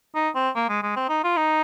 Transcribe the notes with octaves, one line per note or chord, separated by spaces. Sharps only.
D#4
C4
A#3
G#3
G#3
C4
D#4
F4
D#4